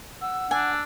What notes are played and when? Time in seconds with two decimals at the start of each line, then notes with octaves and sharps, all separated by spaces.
0.21 F#5 E6
0.51 D4 G#5 E6